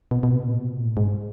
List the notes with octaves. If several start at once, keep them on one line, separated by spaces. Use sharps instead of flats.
B2
B2
C3
A#2
B2
A#2
A2
G#2